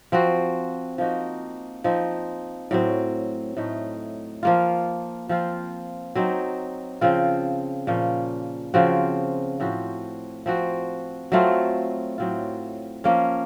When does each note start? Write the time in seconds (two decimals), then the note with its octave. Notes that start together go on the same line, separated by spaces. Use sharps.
0.12 F3 C4 F#4
0.98 F3 A#3 D#4 F#4
1.84 F3 C4 D#4
2.71 A2 F#3 C4
3.57 A2 A3 D#4
4.43 F3 A#3 F4
5.29 F3 C4 F4
6.15 F#3 C4 D#4
7.01 C#3 F3 C4 F4
7.87 A#2 F3 A#3 C#4
8.74 C#3 F3 C4 F#4
9.60 A2 F3 C4 F#4
10.46 F3 C4 F#4
11.32 F#3 A3 C4 F4
12.18 A2 F#3 C4 F4
13.04 F3 A#3 C#4